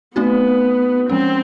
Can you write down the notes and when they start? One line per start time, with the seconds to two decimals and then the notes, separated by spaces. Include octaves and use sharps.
0.16 A3 B3 C4 D#4 F#4
1.09 F3 G#3 C4 C#4